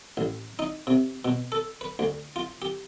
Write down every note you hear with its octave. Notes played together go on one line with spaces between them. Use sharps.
A1
D#4
C3
B2
A4
B4
D2
F4
G4